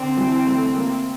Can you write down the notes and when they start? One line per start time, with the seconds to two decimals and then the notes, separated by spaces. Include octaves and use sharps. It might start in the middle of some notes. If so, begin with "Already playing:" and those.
Already playing: D3 C4 D4
0.17 E3
0.47 A3
0.74 A#3